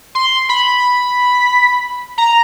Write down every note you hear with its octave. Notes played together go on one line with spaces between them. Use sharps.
C6
B5
A#5